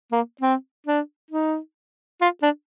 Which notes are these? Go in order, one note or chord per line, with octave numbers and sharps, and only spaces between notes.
A#3
C4
D4
D#4
F4
D4